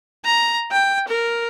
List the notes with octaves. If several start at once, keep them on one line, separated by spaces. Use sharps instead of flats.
A#5
G5
A#4